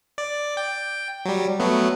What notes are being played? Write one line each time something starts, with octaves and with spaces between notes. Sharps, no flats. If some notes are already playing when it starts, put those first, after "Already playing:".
D5
G5
F#3 G3
F#3 A3 B3